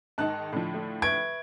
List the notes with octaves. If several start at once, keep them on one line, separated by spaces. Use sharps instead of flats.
G#2 D#3 D#4 A5 F#6
A2 D3 F3
A3
B4 E5 C#6 G#6 D7